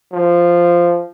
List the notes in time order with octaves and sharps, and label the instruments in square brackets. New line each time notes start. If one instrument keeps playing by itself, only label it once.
[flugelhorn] F3